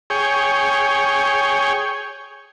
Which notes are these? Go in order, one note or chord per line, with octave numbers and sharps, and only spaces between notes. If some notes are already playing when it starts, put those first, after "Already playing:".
G#4 C#5 G5